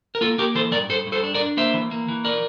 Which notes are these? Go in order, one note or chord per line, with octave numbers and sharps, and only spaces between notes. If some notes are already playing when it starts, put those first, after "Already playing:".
A#4
A#3 F4 A4
A#3 G4 A#4
E3 A4 C5
G2 A#4 D5
G2 A4 C5
G2
A4 C5
D4
A#4 D5
D4
A#3 C5 E5
E3
A#3
E3
A#4 D5